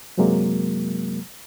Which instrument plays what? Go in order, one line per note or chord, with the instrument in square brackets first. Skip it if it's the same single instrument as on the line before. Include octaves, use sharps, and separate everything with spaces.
[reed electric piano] F#2 C3 F#3 G#3 A#3